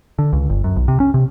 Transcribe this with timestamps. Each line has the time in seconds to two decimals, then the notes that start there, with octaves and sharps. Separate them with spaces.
0.19 D3
0.33 C#2
0.49 G1
0.64 F#2
0.76 B1
0.88 C3
1.00 C#4
1.14 C3